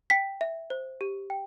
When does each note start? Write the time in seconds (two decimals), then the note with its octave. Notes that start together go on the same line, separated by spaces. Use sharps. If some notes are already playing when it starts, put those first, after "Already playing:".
0.10 G5 B6
0.41 E5
0.70 C5
1.01 G4
1.30 G5